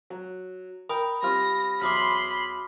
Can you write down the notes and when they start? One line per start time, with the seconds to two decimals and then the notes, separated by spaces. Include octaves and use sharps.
0.10 F#3
0.89 A#4 G5 A#5 B5 D#6
1.22 G3 C4 F4 B5 F6 A#6
1.81 E2 F#3 B5 C6 D6 D#6 F6